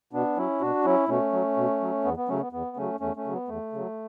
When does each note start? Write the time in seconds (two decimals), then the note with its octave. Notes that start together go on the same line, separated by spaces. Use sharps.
0.13 B2 B3 D4
0.37 F#3 C#4 E4
0.61 B2 D4 F#4
0.85 F#3 C#4 E4
1.08 B2 A3 C#4
1.32 F#3
1.57 B2
1.81 F#3
2.04 E2 B3
2.17 B3
2.29 C#3 F#3 A3 C#4
2.41 B3
2.53 E2 B3
2.77 C#3 F#3 A3 C#4
3.00 E2 A3 C#4
3.16 A3 C#4
3.25 C#3 F#3
3.33 B3
3.48 E2 A3
3.73 C#3 F#3